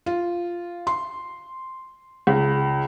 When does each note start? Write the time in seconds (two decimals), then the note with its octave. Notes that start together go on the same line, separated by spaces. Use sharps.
0.06 F4
0.87 C6
2.27 C#2